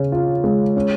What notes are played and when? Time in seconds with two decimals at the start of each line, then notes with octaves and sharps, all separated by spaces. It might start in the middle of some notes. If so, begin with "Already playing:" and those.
Already playing: C#3 C#4
0.12 F4
0.44 G#3
0.76 C#4